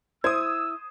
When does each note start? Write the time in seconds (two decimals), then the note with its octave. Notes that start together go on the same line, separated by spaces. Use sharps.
0.24 E4 C5 D#6 E6 G#6